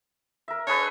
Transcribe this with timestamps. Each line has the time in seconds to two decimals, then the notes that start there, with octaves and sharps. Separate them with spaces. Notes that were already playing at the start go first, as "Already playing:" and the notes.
0.48 A#4 E5
0.67 D4 G#4 B4 C#5